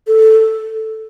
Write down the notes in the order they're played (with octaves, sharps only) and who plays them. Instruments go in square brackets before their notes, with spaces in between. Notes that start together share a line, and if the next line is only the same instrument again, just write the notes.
[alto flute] A4